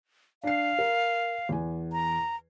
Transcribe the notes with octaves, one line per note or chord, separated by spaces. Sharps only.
D4 F5 C7
A#4
E2 G#5
A#5